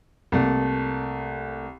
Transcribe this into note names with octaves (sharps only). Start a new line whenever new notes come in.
C2 A3 A#3